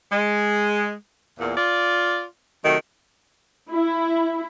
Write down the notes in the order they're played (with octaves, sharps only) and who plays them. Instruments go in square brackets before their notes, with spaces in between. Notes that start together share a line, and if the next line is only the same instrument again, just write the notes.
[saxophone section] G#3
E2 A#2
F4 D5
C3 D#3 F#3 A3
[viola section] E4